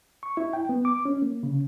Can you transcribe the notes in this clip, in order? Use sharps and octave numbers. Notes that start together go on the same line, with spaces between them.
C#6
E4
G5
B3
D6
C#4
A#3
C#3